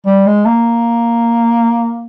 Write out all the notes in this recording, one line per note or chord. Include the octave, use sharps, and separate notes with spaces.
G3
G#3
A#3